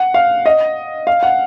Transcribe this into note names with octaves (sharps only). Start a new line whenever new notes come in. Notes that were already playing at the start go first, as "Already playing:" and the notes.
Already playing: F#5
F5
D#5
F5
F#5